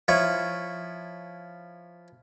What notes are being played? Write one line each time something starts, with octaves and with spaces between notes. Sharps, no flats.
F3 E4 C#5